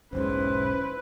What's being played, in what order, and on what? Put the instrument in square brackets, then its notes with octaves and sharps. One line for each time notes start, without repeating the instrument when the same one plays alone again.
[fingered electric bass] E1 B1 G#2 [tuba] C#4 [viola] E4 B4 [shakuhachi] C5